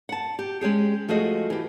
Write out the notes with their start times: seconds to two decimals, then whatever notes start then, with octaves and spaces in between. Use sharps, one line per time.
0.09 F#5 A5
0.39 G4
0.61 G#3 C#4 G4 G#4
1.08 F3 A3 F#4 G#4 D#5
1.50 E3 G4